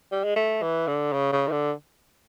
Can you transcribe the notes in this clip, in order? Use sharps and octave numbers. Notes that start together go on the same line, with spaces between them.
G3
G#3
A3
E3
D3
C#3
C#3
D#3
D3